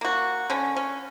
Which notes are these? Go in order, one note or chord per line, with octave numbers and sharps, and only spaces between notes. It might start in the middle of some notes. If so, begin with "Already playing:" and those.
A#3 F#4
D3 C#4
C#4